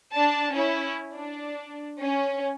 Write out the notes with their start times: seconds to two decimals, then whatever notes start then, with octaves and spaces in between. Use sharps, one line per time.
0.12 D4 A5
0.53 C#4 E4
1.13 D4
2.00 C#4